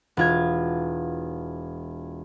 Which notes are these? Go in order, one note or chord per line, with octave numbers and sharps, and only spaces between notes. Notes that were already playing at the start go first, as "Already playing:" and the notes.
E1 F4 G#6